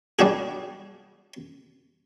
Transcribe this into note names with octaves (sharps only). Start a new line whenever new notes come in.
G3 D4 F#4 G#4